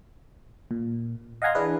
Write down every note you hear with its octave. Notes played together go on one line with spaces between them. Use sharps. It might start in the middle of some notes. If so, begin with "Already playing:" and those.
A#2
D#5 F5 F#5 G#5 A#5 C6
E3 D4 E4 G#4 B4